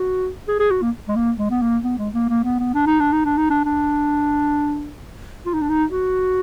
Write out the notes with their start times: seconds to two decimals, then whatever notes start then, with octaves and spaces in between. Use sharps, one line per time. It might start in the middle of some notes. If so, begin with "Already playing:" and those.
Already playing: F#4
0.48 G#4
0.60 G#4
0.70 F#4
0.82 A#3
1.08 G#3
1.16 A#3
1.39 G#3
1.50 B3
1.62 A#3
1.84 B3
1.98 G#3
2.14 A#3
2.29 A#3
2.44 B3
2.59 B3
2.74 D4
2.87 D#4
3.00 D4
3.12 D#4
3.25 D4
3.37 D#4
3.50 D4
3.65 D4
5.46 F4
5.54 D#4
5.61 D4
5.69 D#4
5.91 F#4